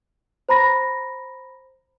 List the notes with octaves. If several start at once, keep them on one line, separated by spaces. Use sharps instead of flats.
C5 A#5 B5 A#6